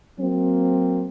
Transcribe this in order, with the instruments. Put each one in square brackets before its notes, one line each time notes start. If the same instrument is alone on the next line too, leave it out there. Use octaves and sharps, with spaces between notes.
[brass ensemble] F#3 A#3 C4